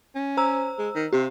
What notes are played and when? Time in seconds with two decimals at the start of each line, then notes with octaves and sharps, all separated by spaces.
0.15 C#4
0.37 C5 A#5 E6
0.78 G#3
0.95 D#3
1.13 C3 G4